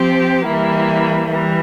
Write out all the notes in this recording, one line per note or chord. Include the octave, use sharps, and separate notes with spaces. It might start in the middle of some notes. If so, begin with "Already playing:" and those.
Already playing: F3 C4 G4
E3 G3 A#3 E4
E3 G3